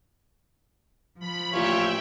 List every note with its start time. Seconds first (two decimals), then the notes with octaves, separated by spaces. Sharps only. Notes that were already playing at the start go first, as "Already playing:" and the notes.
1.20 F3 B5
1.54 A1 A#2 F4 C#5 E5 G5